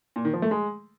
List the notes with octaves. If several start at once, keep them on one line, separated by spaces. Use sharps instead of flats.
A#2
D#3
F3
A3
G#3